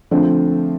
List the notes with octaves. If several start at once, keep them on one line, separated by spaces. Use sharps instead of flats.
D3 F3 A3 C4